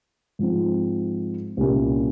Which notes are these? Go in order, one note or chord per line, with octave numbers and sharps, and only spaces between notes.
G#2 F3 C4
C2 A#2 G3 A#3 C#4